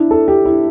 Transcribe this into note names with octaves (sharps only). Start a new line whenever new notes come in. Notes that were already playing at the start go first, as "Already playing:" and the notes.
Already playing: D4 E4
A4
G4
E4